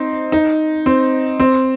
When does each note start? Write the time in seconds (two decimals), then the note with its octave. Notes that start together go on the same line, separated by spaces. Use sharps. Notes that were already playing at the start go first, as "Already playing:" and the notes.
Already playing: C4 D#4
0.32 D#4
0.86 C4
1.40 C4